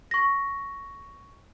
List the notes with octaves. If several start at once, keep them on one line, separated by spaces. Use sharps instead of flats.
C#6 A#6